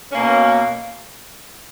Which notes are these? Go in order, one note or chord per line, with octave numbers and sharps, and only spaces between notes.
B2 A#3 C#4